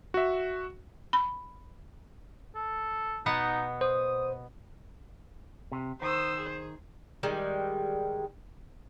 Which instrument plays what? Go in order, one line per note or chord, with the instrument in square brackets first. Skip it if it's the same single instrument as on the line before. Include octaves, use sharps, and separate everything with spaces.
[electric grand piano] F#4 E5
[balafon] B5
[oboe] A4
[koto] B2 B3 F#5 [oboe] D#4
[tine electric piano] C5 [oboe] D#6
[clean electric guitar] C3
[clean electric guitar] D#3 [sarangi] C5 [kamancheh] D#6 E6
[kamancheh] G#4
[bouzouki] D#3 G3 G#3